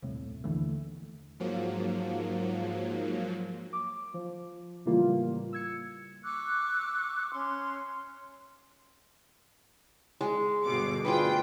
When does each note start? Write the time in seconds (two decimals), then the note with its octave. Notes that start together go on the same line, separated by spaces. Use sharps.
0.02 D#1 C2 A2
0.44 D#2 D3 E3 A3
1.40 G#2 F3 F#3 A#3
3.73 D6
4.14 F3
4.85 A2 C#3 E3 G3 A#3 F4
5.53 E6 G#6 C#7
6.23 C#6 D6 E6 F#6
7.32 C#4 C6
10.21 G#3
10.65 G1 B2 D6
11.05 D2 F4 G#4 B4 G5